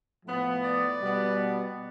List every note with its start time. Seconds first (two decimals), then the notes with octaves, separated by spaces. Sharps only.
0.25 A2 F3 B3
0.63 D5
1.00 B2 G3 B3